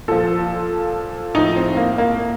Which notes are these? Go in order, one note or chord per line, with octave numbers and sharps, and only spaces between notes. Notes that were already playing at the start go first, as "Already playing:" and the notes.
A#2 F3 A4
A2 F3 D#4
C4
A#3
A#3